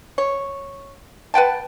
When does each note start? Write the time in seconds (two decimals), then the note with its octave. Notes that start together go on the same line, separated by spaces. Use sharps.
0.18 C#5
1.34 B4 F#5 G5 A5